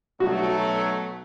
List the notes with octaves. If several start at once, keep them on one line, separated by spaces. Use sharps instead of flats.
B1 F#3 A3 F#4